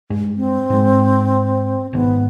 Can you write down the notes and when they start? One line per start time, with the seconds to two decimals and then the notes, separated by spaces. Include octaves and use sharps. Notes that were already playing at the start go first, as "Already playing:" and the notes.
0.10 G2 G#3
0.37 C4
0.70 G#2 G#3
1.93 G#1 G#2 B3